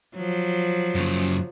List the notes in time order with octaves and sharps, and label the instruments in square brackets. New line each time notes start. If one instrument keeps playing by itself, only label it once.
[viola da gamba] F3 F#3
[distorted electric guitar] F#2 C#3